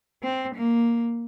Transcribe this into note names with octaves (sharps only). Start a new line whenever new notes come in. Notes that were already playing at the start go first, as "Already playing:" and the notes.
C4
A#3